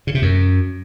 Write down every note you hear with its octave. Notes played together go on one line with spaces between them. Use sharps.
C#3
C3
F#2